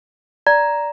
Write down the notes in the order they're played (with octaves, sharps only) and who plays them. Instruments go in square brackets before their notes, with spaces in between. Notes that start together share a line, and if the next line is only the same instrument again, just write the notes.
[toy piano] D5 [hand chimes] A#5